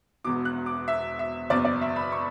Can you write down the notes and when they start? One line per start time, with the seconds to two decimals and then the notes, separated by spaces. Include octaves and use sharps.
0.24 E1 E2 B2 D6
0.45 F#6
0.66 D6
0.88 E5
1.19 E5
1.50 F#1 E2 B2 D5
1.65 D5
1.81 E5
1.96 B5
2.12 C#6